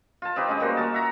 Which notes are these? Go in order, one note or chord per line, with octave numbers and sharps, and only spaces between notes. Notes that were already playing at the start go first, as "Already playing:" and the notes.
F4 A5
C4 D#4 G4 B4
G#3 C#4 D#4
G3 A#3 F#4 C5
C#4 F4 F#4 A5
E5 F#5 A#5